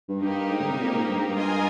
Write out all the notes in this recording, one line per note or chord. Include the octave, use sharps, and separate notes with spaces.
G2
G2 A#3 D#4 G4 A#4
G#2
D3
C3
A#2
G#2
G2
G#2
G2
F4 A#4 D#5 G#5